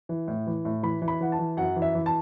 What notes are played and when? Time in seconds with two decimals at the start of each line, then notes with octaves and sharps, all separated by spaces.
0.09 E3
0.28 A2
0.47 E3
0.65 A2
0.83 E3 B5
1.02 E3
1.08 B5
1.20 E3 F#5
1.32 A5
1.39 E3
1.57 F#2 F#5
1.76 E3
1.82 E5
1.95 E3
2.06 A5